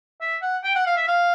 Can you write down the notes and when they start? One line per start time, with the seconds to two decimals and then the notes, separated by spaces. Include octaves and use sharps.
0.21 E5
0.42 F#5
0.64 G5
0.75 F#5
0.86 F5
0.97 E5
1.08 F5